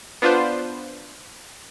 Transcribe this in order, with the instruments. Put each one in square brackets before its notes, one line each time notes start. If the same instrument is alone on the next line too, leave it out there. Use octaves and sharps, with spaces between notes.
[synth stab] B3 D4 F4 B4 C5